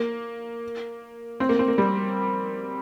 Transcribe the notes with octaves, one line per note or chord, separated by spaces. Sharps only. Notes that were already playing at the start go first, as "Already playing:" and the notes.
Already playing: A#3
C4
A#3
C4
A#3
G3